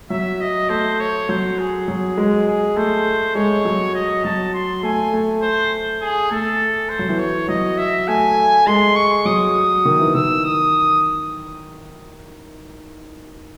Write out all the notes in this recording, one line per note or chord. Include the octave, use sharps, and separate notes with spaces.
F#3 E5
D#5
A3 C5
C#5
F#3 C5
G#4
F#3
G#3
G#4
A3 C5
G#3 C#5
F#3
D#5
F#3 A5
C6
A3 G#5
A3
C5
G#4
A3 A4
C5
F#3
E3
C#5
F#3 D#5
E5
A3 G#5
G#3 C6
C#6
F#3 D#6
D#3
E3
D#3 E6
D#6